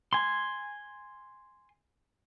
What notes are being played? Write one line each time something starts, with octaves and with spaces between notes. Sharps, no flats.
G#5 C6